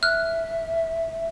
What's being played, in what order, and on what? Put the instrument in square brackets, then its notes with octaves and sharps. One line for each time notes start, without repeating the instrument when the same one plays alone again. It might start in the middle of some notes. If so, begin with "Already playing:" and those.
[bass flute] E5 [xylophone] F6 F#6